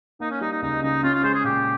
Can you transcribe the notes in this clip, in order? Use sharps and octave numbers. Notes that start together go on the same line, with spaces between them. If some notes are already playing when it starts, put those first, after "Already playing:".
A#3 D#4
C#4
G3 D#4
D#4
C#2 D#4
C#3 D#4
C#4 F4
F4
G#3 C5
G#4
A#2 G4